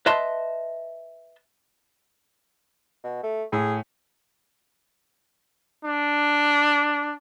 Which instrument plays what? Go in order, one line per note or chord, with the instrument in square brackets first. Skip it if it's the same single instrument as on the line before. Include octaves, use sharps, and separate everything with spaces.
[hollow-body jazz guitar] B4 D#5 E5 A5 C6
[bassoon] B2
A3
[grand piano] A2 [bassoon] G#4
[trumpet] D4